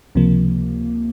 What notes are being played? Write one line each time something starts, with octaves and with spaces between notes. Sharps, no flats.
C#2 C3 F3 A#3